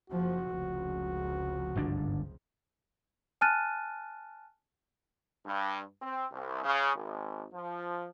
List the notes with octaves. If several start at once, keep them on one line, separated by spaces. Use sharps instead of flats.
F#1 F3 F#4
F1 C#2 F3
G1 G#2 D4
G#5 A5 F6 F#6 A6 D#7
G2
C4
C2
C#3
G#1
F3